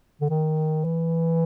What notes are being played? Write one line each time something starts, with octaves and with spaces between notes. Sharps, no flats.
D3
D#3
E3